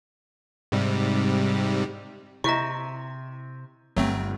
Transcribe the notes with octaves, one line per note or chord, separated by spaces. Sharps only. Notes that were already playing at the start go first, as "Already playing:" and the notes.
G#2 C3 G3
C3 E4 D#5 E5 A#5 C#6
G1 G2 F#3 A3 C4